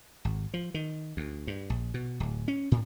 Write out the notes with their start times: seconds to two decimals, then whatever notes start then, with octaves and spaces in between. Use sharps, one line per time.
0.25 G#1
0.54 F3
0.74 D#3
1.17 D2
1.47 G2
1.70 A#1
1.94 B2
2.20 D1
2.48 C#4
2.72 A2